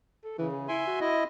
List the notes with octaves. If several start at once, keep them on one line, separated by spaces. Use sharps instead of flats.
A4
C#3 E3
G#4
E4 E5 G#5 C6
F#4
E4 D#5